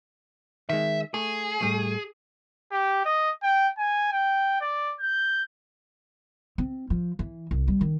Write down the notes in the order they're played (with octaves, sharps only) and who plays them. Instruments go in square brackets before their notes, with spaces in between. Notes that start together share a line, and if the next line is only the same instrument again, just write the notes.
[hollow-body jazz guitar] D#3 G#3 [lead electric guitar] E5
[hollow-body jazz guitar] A3 [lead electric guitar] G#4
[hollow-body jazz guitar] A2 G3 A3
[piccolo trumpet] G4
D#5
G5
G#5
G5
D5
G6
[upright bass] C4
F3
E3
C2
G3
D#3